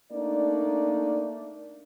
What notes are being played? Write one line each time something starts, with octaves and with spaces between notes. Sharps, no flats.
A3 A#3 D4 D#4 D5